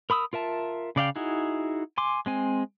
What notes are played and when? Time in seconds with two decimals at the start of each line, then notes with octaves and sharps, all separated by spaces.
0.10 A#4 B5 D#6 E6
0.33 F4 A#4 E5 A5
0.96 C#3 D5 F5 G5
1.16 D#4 E4 F#4 G#4
1.98 G#5 C6 D6
2.26 G#3 C4 G#5